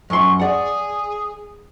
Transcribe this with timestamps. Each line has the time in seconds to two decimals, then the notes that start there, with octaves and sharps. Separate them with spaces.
0.10 F#2 C6 C#6
0.39 G#4 D5 F#5